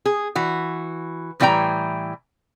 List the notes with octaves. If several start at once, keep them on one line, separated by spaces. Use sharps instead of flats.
G#4
E3 F#4
A2 E3 G3 E4 G5 A#5